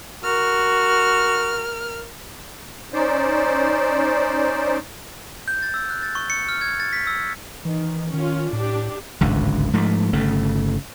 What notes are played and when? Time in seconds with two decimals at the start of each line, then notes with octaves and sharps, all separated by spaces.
0.24 F#4 A#4 F6
2.93 C#4 D#4 C5 D5
5.48 G6
5.62 A6
5.74 E6
5.90 F#6
6.03 A6
6.15 C#6
6.30 C#7
6.49 F6
6.61 G#6
6.80 A6
6.93 B6
7.07 E6
7.65 D#3 E3
8.13 D#3 C#4 F4
8.53 A2 D4 G4
9.21 D1 G#1 C#2 D3
9.73 G#2 F3 A3
10.13 G1 C#3 A3